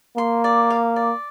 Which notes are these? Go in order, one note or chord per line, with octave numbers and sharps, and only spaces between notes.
A#3 C6
D5
F5
D5